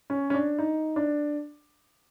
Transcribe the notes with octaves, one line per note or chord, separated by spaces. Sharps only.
C#4
C#4
D4
D#4
D4